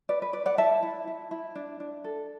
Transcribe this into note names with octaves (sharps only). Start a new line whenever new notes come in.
B4 D5
B4
B4 D5
D5 F#5
E4 E5 A5
E4
E4
E4
D4
D4
A4